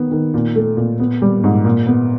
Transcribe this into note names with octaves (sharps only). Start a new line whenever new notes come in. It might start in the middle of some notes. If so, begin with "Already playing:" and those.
Already playing: D#3 B3
D#3
A#2
A3
A#2
B3
G3
G#2
A#2
B3